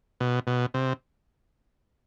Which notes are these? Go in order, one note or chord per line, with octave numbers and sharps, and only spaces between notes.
B2
B2
C3